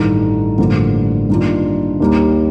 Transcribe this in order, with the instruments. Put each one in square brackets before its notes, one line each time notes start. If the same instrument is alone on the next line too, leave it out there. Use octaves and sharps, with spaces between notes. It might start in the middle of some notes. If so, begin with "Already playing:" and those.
Already playing: [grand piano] A1 G2 D#3 A3 D#4
A1 G2 D3 F3 A#3
G2 D#3 A#3 D4 F4
D#2 D#3 G3 A#3